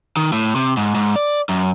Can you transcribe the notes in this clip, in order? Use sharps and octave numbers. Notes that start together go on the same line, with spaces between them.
D#3
A2
C3
G#2
G#2
D5
F#2